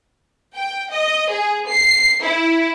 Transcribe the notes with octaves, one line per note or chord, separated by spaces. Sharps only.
G5
D#5
G#4
C7
E4